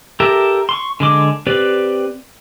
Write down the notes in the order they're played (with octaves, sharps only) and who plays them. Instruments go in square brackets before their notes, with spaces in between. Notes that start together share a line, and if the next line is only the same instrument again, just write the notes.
[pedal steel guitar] G4 A4 A#4 E5
C6 C#6
D3 G#3 D6
C4 G4 B4 D5